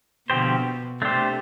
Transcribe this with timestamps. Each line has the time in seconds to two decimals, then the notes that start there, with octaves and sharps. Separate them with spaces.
0.29 B2 D3 F3 C4 G4 C5
1.02 C3 A3 D4 G4 C5